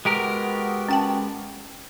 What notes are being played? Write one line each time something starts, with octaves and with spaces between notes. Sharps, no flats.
G#3 B3 F#4 G4 A#4
C#4 G5 A5